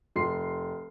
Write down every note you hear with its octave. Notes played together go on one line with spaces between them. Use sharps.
F1 C6 C7